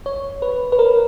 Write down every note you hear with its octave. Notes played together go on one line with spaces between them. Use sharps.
C#5
B4
B4
A#4